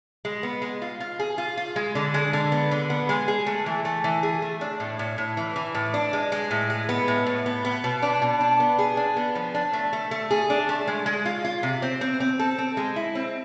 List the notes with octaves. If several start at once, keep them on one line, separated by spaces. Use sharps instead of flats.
G#3
B3
G#3
F4
F4
G#4
F4
F4
G#3
D3
G#3
D3
B3
D3
B3
G#3
G#4
A3
E3
A3
E3
G#4
A3
D4
A2
A2
A2
E3
E3
A2
D4
G#3
G#3
A2
G#3
B3
A2
A2
B3
B3
B2
D4
B2
D4
B3
G#4
D4
B3
F3
D4
A3
A3
A3
G#4
D4
A3
G#3
G#3
F4
F4
C3
C4
C4
C4
A4
C4
G#3
E4
C4